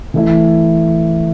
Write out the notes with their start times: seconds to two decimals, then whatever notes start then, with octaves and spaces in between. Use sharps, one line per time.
0.14 E3 A3 E4